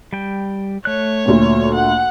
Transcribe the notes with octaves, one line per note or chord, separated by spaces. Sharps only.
G3 G5
A3 C#5 F#6
D2 A#2
F#5